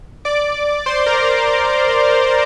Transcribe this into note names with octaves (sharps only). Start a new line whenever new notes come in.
D5 D6
C5 C6
A#4 A#5